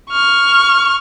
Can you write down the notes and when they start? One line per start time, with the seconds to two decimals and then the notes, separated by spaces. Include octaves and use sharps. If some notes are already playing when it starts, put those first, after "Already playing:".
0.11 C#6 F6